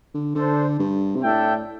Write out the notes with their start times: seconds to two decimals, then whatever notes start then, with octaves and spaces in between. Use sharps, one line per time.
0.14 D3
0.36 D3 D4 A4 C5
0.79 G2
1.16 C3
1.24 A2 D4 A4 E5 G5